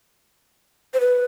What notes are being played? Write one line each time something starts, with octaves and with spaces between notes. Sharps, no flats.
C5
B4